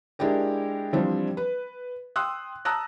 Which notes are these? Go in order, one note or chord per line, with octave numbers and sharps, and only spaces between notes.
G#3 D4 E4 G4 A#4
E3 F3 G3 C4 D4
B4
G5 C6 D#6 E6 F#6
A5 A#5 D#6 E6 F#6 A#6